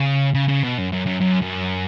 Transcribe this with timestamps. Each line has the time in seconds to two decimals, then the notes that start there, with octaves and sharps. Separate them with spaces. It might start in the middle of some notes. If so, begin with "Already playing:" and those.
Already playing: C#3
0.34 C#3
0.48 C#3
0.63 B2
0.78 F#2
0.92 F#2
1.06 F#2
1.21 F#2
1.42 F#2